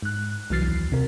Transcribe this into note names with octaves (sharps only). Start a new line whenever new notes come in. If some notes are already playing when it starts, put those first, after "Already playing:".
G#2 F#6
C2 E3 F#3 F6 A6 C7
D#2
C3 A#4